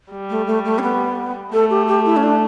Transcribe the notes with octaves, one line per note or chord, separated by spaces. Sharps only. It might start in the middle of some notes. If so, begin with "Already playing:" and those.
G3
A3
A3
A3
C#4
B3
A3 A4
G4
G4
E4
C#4
D4